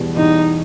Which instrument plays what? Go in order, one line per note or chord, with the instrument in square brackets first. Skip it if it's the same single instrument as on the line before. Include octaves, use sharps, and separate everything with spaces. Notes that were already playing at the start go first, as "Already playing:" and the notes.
Already playing: [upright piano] E2 B2 G3
[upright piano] E2 B2 G3 [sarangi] D#4